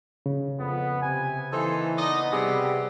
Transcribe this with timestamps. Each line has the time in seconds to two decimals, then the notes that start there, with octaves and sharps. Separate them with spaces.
0.26 C#3
0.59 F2 B3
1.02 C3 G#5
1.52 E3 A#3 D#4 A4 C5
1.98 B3 D#4 D5 D#5
2.33 C3 G3 G#4